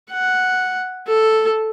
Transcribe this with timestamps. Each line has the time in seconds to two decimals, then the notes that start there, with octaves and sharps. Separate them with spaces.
0.11 F#5
1.07 A4